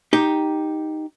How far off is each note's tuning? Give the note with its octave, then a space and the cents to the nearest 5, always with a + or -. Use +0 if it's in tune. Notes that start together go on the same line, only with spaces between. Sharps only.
D#4 +0 G4 +0